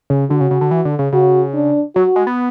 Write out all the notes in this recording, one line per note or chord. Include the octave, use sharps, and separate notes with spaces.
C#3
D3 F#4
C#3
C#3
D3
E3
D3
C#3
C#3 F#4
D4
F#3 F#4
G#3
B3